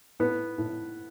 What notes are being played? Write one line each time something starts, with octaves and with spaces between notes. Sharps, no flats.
A2 B3
A2